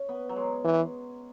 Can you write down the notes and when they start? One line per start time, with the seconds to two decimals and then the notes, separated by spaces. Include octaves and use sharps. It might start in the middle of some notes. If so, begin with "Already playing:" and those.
Already playing: C#4
0.09 B3
0.29 F#3
0.36 G#3
0.64 E3